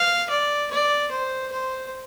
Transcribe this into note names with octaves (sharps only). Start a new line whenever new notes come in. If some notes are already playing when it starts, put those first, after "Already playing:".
Already playing: F5
D5
D5
C5
C5